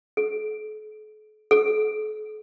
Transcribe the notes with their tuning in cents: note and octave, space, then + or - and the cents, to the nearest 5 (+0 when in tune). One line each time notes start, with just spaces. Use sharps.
A4 -45
A4 -45